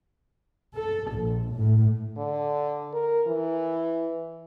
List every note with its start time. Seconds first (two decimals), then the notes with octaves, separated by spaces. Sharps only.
0.76 A4
1.13 A#1
1.55 A2
2.17 D3
2.94 A#4
3.27 E3